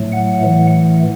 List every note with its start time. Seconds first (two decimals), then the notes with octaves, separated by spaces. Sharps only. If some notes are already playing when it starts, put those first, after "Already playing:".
Already playing: A2 F#3 A3
0.12 F#5
0.43 A2 E3 A3